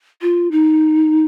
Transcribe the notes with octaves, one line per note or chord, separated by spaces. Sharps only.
F4
D#4